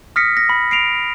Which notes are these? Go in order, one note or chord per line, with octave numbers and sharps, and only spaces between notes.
D#6 F6 A#6 B6 C#7
A#6
B5
C7 D7 F7